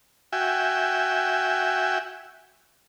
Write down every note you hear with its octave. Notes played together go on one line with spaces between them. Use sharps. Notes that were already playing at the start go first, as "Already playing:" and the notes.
F#4 E5 G5 G#5